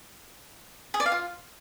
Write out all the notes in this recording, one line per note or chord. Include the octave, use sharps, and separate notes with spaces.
G#4
D5
F5
F4